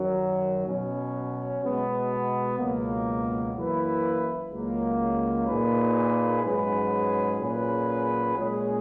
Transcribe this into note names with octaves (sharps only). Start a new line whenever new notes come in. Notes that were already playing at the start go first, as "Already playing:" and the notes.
Already playing: F#2 D#3 F#3
B2 F#3 C#4
B2 G#3 B3
C#2 B2 F#3 A#3
F#2 E3 A#3 E4 B4
C#2 C#3 F#3 A#3
A#2 A#3 D#4 G#4 B4
G#2 F#3 C#4 G#4 B4
A#2 F#3 C#4 G#4 B4
A#2 G#3 C#4 G#4